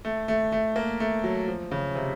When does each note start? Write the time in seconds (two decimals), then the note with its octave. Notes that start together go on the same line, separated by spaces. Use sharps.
0.05 A3
0.28 A3
0.52 A3
0.76 A#3
1.00 A3
1.24 F#3
1.48 F3
1.71 C#3
1.95 C3